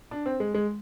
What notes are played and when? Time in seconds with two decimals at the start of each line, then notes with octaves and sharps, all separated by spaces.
0.11 D4
0.26 C4
0.40 G#3
0.54 G#3